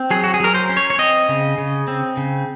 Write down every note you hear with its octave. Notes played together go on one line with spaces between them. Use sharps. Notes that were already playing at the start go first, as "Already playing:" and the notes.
Already playing: C4
F#3 G#4
F#4
G#4
F#3 A#4
C5
C#4
C#5
C#5
C4 D#5
C#3
C#3
C4
C#3